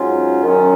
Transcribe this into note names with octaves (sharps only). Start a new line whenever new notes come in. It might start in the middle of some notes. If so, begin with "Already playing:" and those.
Already playing: G#2 F#3 C#4 F4
F#2 D#3 F#3 C#4